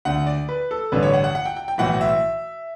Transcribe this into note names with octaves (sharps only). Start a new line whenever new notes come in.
D2 D3 F#5
D5
B4
A4
A1 G2 D3 B4
C#5
F#5
F#5
F#5
G5
G5
G5
B1 A2 E3 F#5
E5